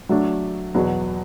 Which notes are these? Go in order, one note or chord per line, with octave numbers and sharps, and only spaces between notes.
F#3 A3 D4
E2 B2 F#3